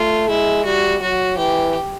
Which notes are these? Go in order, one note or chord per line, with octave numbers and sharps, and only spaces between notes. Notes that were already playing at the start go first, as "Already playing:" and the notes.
Already playing: A3 F4
G#3 E4
G3 F#4
F#3 F#4
E3 G4